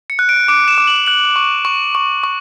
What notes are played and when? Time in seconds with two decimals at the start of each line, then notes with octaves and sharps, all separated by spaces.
0.10 C#7
0.19 F#6
0.29 D7
0.48 D6 D7
0.68 E7
0.78 D6
0.87 F#7
1.07 F#6 F#7
1.36 C#6
1.65 C#6
1.95 C#6
2.24 C#6